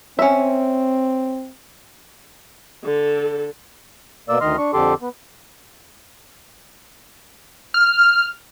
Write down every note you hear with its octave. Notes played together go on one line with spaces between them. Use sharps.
C4 C#4 E5
D3 A4
B2 A#3 D5 E6
D2 D#3 D#5 C6 F6
D4 C#6
F2 D3 G4 A4 C6 D6
B3
F6